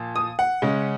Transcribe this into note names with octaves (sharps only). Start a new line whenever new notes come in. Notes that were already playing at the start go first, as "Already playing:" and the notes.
Already playing: A#2 F3
D#6
F#5
C#3 G#3 C#4